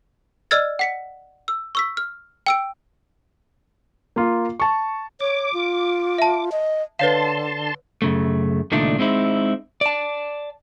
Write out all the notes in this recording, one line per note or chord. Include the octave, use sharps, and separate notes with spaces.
D5 D#5 E6 F6 G#6 A6
F#5 B6 C#7
E6
C#6 E6 B6
F6
G5 E6 D7
A#3 F4
A5 C#6
C#5 D6
F4
E5 A5
D#5
D3 B4 C#5 F5 A5 C6
F#2 C#3 A3
C#2 A#2 D#3 A3 D4 D5
G#3 C4 D#4 E4
D5 A5